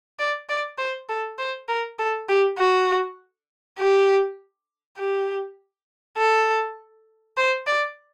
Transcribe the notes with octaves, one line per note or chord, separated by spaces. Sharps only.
D5
D5
C5
A4
C5
A#4
A4
G4
F#4
G4
G4
A4
C5
D5